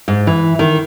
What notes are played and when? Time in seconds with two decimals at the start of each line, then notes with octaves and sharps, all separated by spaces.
0.08 G#2
0.27 E3
0.59 D#3